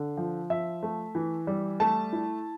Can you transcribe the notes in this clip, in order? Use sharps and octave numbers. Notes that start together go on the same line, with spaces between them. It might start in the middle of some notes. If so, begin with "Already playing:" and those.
Already playing: D3
F3
F3 E5
A3
E3
G3
A3 A5
E4